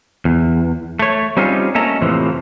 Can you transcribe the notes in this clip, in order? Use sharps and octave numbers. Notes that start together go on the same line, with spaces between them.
E2
A3 C#5
G3 C4 C#4 D#4 F4 G#4
A3 A#3 C#4 A4 D#5 A#5
F2 A2 C3 E3 F3